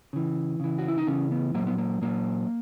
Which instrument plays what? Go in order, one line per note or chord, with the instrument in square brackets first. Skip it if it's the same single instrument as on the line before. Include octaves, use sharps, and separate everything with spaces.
[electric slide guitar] C#3 E3
C#3 E3
F#4
E4
D#4
C#3 E3 C#4
B3
A#2 F#3 A#3
B3
A#3
A#2 F#3 A#3